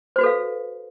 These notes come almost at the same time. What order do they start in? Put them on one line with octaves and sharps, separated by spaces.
C5 F#4 B4 A4 F5